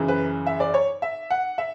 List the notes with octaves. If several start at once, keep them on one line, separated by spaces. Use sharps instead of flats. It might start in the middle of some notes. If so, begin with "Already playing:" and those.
Already playing: F#2 C#3 E3
B4
E5
D5
C#5
E5
F#5
E5